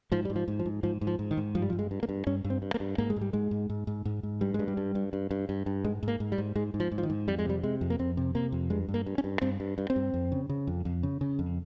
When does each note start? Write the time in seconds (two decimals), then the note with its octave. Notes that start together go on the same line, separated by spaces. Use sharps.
0.12 G#2 F3
0.25 G#2 G3
0.36 F3
0.48 G#2
0.59 F3
0.66 G#2
0.83 G#2 F3
1.01 G#2
1.07 F3
1.19 G#2
1.31 D#3
1.37 G#2
1.55 G2 F3
1.62 G3
1.70 F3
1.73 G2
1.79 G#3
1.91 G2
2.03 A#3
2.09 G2
2.27 G2 C#4
2.44 G2
2.50 C4
2.62 G2
2.74 A#3
2.80 G2
2.98 G#2 A#3
3.10 G#3
3.16 G#2
3.21 G3
3.33 G#2 G#3
3.51 G#2
3.70 G#2
3.87 G#2
4.05 G#2
4.23 G#2
4.41 G2 G3
4.54 G2 G#3
4.68 G3
4.77 G2
4.95 G2
5.13 G2
5.31 G2
5.49 G2
5.66 G2
5.84 G#2 G#3
6.03 G#2
6.08 A#3
6.20 G#2
6.32 G3
6.38 G#2
6.55 G#2 G#3
6.74 G#2
6.80 F3
6.92 G#2
6.98 F3
7.03 D#3
7.10 G#2
7.27 F2 G3
7.38 G#3
7.45 C3 G3
7.63 C3 G#3
7.81 F2
7.90 A#3
7.99 F2 C4
8.17 C3
8.35 C3 A#3
8.52 F2
8.70 G2 G#3
8.88 G2
8.94 A#3
9.06 G2
9.18 C#4
9.24 G2
9.42 G2 C4
9.60 G2
9.78 G2
9.90 C4
9.96 G2
10.14 F2
10.32 C#3
10.49 C#3
10.67 F2
10.85 F2
11.03 C#3
11.21 C#3
11.39 F2